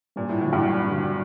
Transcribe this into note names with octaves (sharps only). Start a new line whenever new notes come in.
G2 A#2
A2
A2 D3 F#3
G2
G2
D3 F#3